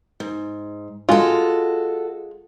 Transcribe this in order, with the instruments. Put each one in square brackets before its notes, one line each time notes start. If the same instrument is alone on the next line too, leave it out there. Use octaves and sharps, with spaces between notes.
[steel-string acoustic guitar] G#2
[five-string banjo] G#3 F4 [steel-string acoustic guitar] F#4 A4